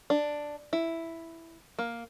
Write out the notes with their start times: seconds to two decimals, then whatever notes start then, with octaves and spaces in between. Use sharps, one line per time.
0.10 D4
0.73 E4
1.79 A#3